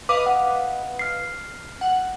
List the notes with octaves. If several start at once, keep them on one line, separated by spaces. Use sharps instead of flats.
B4 D#5 F5 D6
F#5
F6 C7
F#5